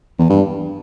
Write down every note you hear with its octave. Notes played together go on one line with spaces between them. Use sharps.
E2
G2